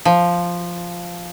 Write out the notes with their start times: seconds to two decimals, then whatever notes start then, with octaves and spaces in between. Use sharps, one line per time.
0.05 F3